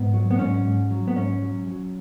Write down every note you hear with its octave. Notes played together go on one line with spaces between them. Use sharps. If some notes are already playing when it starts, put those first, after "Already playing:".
Already playing: G#2 B3
F#3
B3
G#2 C#4
G#2
F#3
B3
G#2 C#4
F#3
F#3